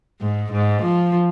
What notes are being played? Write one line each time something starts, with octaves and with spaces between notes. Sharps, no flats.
G#2
G#2
F3